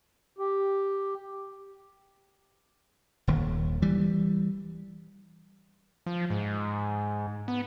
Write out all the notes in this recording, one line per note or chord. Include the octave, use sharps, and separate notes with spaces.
G4
D#1 D#2
E3 G3
F3
G#2
B3